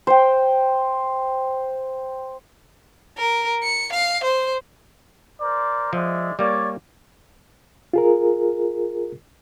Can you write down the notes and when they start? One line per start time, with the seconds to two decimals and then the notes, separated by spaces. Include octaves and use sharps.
0.07 C5 G5
3.18 A#4
3.63 C#7
3.93 F5
4.24 C5
5.40 A#4 C5 D5
5.93 F3 G#3 D5 E5
6.39 G3 A#3 C#5 D5 D6
7.94 F4 G#4 A#4